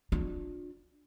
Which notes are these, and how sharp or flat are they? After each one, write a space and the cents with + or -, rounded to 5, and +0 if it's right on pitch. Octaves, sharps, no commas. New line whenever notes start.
D4 +0 F4 +40